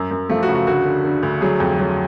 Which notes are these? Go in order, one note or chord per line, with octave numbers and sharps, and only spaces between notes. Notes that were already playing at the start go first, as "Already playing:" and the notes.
Already playing: F#2
F#2
F3 A3
F#4
C#3
F#4
D2 F#4
D3
D3
D2
F#3 G#4
F2
F#3